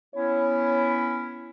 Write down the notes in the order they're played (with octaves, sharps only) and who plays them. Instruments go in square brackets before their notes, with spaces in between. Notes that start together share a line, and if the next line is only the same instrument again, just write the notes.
[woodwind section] B3 C#4 E4 [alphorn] C#5